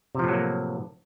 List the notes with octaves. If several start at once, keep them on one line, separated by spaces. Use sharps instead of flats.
A2 C3 F3 F#3 A#3